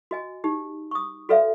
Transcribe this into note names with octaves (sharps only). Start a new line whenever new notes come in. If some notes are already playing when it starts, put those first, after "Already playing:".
F#4 D#5 G#5
D#4 G4
C#6 D#6
F#4 A4 B4 D5 E5 F5